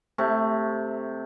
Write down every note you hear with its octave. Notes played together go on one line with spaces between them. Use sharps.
C3 A3